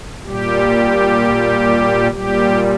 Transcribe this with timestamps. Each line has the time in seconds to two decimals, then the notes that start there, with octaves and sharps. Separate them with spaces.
0.25 A#2 G3 G4
2.11 A#2 G3 G4